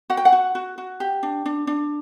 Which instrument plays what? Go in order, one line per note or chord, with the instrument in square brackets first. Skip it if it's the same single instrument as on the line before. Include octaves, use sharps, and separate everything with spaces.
[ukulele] F#4 F#5
G5
F#5
F#4
F#4
F#4
G4
D4
D4
D4